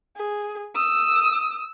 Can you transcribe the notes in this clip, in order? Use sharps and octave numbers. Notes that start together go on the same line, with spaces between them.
G#4
D#6 E6